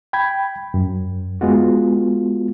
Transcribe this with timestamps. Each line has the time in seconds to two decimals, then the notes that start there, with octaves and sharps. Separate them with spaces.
0.13 G5 B5 G#6
0.74 F#2
1.41 G#3 B3 F4 F#4